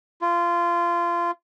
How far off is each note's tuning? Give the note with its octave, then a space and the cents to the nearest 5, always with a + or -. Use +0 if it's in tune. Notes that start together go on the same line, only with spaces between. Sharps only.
F4 -20